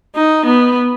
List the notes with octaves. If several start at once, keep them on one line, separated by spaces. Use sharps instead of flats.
D#4
B3